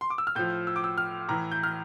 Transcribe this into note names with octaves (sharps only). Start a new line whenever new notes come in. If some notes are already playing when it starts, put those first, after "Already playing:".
C6
D6
E6
F6
A2 F3 G6
E6
D6
E6
F6
A2 E3 A#5
G6
F6